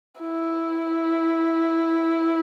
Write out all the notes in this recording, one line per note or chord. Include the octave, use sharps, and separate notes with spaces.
E4